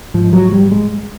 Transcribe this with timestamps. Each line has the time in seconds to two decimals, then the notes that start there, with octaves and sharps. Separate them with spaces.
0.14 G#2 F3
0.33 F#3
0.52 G3
0.71 G#3